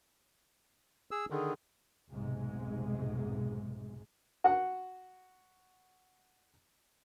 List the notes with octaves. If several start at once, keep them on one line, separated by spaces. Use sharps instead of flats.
G#4 E6
D3 D#3 G#4
F1 B1 G#2 C3 G#3
F#4 F#5